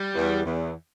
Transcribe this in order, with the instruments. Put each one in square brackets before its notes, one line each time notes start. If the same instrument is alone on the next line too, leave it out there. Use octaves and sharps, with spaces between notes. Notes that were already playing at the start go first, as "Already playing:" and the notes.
Already playing: [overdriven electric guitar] G3
[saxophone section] E2
E2